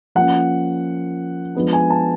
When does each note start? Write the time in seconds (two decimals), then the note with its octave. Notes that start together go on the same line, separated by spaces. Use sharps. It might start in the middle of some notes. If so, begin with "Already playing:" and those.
0.15 F3 A#3 C#4 F#5
1.55 F3 G#3 B3 D4
1.73 G#5
1.90 A5